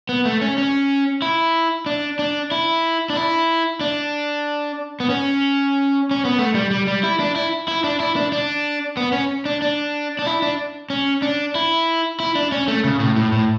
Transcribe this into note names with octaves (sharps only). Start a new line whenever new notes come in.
B3
A3
C#4
C#4
E4
D4
D4
E4
D4
E4
D4
B3
C#4
C#4
B3
A3
G3
G3
G3
E4
D4
E4
E4
D4
E4
D4
D4
B3
C#4
D4
D4
D4
E4
D4
C#4
D4
E4
E4
D4
C#4
A3
C#3
A2
A2
A2